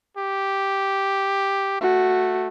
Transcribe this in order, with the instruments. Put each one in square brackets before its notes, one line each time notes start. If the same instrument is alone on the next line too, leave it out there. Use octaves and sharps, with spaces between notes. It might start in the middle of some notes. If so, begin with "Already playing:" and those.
[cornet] G4
[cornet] A3 [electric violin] F#4